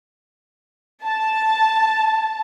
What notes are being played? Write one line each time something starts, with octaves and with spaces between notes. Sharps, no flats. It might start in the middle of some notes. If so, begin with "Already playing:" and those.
A5